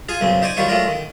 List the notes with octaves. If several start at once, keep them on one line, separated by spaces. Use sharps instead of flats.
F4 G#4 F5 G#5
B1 F#2 C#3 C4
D#4 C5 D5 G#5 D6
D#3 F#3 G3 F4 C5 C#6
F#3 G#3 A3 F4 A#4 D5
D#3